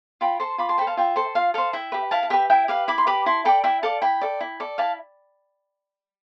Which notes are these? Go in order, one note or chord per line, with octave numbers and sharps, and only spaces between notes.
F4 G5 B5
A4 C5 A5 C6
F4 B5 D6
A5 C6
A4 C5 G5 B5
F5 A5
F4 E5 G5
A4 C5
F4 F5
A4 C5 F5
E4 E5 G5
G4 B4
E4 F5 A5
A5
G4 B4 E5 G5
E4 E5 G5
G4 B4 F5
E4 B5 D6
C6
G4 B4 B5 D6
E4 A5 C6
A4 D5 G5 B5
E4 E5 G5
A4 D5 F5 A5
E4 G5 B5
A4 D5
E4
A4 D5
E4 F5 A5